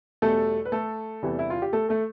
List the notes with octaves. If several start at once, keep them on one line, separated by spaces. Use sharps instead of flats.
E2 B2 G3 A3 A4
B4
A3 A4
E2 C3 E3 G3
E4
F4
G4
A3 A4
A3 A4